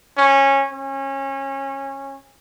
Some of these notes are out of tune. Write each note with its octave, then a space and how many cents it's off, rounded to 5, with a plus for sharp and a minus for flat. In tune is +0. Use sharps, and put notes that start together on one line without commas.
C#4 -15
C#4 -25